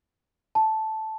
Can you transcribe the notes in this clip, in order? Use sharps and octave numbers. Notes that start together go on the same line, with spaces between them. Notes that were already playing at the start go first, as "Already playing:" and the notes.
A5